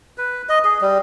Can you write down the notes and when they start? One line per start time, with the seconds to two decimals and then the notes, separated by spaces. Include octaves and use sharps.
0.18 B4
0.49 D#5
0.65 G#4
0.81 G3